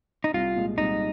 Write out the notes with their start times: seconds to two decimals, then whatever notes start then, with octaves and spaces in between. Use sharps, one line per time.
0.24 D#4
0.34 C2 F4
0.56 A#2 G#3
0.78 C2 D#4